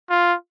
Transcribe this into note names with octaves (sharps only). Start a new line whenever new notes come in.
F4